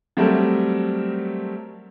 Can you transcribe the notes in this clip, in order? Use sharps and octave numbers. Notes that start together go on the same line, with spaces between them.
F#3 G3 A3 C4 A4 A#4